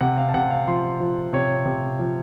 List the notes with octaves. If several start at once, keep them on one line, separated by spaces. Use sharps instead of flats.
C3 F#5
F5
A5
C3 F#5
F5
F3 C6
F3
C3 C#5
C3
F3